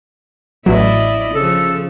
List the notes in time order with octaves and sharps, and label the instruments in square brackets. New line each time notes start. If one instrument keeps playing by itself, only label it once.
[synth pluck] A1 F#3 [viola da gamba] E4 D5 D#5
[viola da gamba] C#3 F3 [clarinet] A4